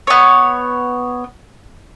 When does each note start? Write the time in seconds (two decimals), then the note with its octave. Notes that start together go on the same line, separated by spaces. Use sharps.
0.07 B3 C#5